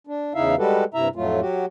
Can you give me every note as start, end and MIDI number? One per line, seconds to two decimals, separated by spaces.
0.07 0.33 62
0.35 0.55 40
0.35 0.55 49
0.35 0.55 63
0.35 0.55 64
0.35 0.55 76
0.35 0.55 77
0.58 0.84 55
0.58 0.84 56
0.58 0.84 66
0.58 0.84 67
0.58 0.84 69
0.58 0.84 71
0.94 1.08 43
0.94 1.08 48
0.94 1.08 64
0.94 1.08 76
0.94 1.08 82
1.16 1.41 41
1.16 1.41 45
1.16 1.41 54
1.16 1.41 57
1.16 1.41 65
1.41 1.65 54
1.41 1.65 66
1.41 1.65 67